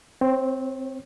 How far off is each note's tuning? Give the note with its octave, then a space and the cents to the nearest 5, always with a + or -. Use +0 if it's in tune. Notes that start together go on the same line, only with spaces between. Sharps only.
C4 +0 C#5 -35